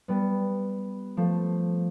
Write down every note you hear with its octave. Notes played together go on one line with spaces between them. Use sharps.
G3 B3
F3 A3